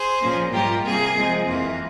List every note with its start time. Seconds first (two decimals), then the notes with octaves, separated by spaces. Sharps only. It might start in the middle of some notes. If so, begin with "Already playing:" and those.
Already playing: G#4 C5
0.22 A#2 F3 A#3 C#4
0.52 G#2 G3 A#3 F4 G4 A#4
0.84 C3 G3 A#3 G#4
1.16 C3 F3 G#3 C4
1.47 F2 E3 A#3 F4